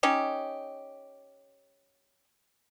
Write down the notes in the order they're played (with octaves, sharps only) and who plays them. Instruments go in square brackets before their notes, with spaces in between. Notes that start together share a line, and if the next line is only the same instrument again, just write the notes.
[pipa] C#4 D#4 G4